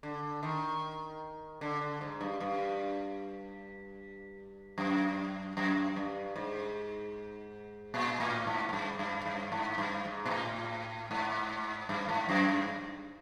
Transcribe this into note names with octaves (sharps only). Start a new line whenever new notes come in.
D3
D#3
D3
D3
G#2
G2
G2
F#2
F#2
G2
G#2
A#2
A2
G#2
G#2
G2
G2
G2
G#2
G2
G#2
A#2
A2
G#2
G2
G#2
F#2
G2